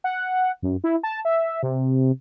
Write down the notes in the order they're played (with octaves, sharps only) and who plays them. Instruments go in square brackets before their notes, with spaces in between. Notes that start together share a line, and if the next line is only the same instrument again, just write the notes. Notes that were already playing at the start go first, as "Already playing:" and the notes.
[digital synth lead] F#5
F#2
E4
A5
E5
C3